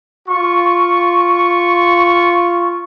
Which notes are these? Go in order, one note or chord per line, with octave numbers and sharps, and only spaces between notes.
F4 C#6